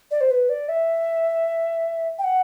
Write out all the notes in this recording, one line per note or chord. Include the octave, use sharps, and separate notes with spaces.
D5
C5
B4
D5
E5
G5
F#5